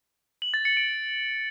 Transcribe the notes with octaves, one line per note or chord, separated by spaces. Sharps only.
F#7
A6
C#7
D7